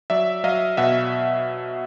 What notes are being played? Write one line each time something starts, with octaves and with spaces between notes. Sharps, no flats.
F#3 D5 E5
F#3 D#5 F5
B2 E5 F#5